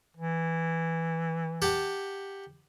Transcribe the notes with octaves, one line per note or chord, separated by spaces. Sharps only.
E3
G4 F#5 A5